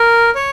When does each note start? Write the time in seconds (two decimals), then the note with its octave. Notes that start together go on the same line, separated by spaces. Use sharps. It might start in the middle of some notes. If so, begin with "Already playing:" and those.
Already playing: A#4
0.35 C#5